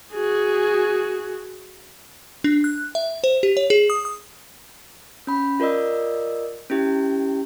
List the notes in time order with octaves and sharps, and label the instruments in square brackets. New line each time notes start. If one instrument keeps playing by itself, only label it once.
[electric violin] F#4 G#4
[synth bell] D4
F#6
E5
C5
G4
C#5
G#4
D#6
D#6
[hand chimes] C#4 B5
F4 A#4 D5 D#5 E6
C#4 E4 G4